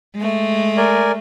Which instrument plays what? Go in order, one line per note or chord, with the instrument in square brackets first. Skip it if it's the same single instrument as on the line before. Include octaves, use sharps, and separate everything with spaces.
[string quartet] G#3 A3
[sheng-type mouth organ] A#4 D5 G#5